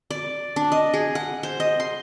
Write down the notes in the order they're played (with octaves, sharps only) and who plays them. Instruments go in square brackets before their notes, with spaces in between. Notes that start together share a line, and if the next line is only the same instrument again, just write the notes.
[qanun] D5
D4
D#5
G#4
F#5
C5
D#5
C6